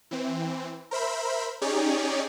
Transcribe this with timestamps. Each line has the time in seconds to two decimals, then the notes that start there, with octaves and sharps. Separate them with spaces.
0.11 E3 C4
0.91 A#4 C5 E5 B5
1.61 C#4 D#4 G4 G#4 C#5 D5